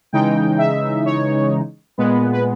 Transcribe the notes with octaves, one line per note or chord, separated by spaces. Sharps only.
C#3 E3 G#3 D#4 G5
E5
C#5
A#2 G#3 B3 B4
B4